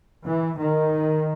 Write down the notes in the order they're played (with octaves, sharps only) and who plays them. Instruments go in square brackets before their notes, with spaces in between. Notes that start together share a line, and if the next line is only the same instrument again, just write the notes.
[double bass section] E3
D#3